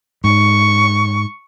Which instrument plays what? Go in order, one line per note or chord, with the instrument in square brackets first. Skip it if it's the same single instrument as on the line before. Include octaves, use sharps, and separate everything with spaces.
[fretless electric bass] G#2 [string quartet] C#6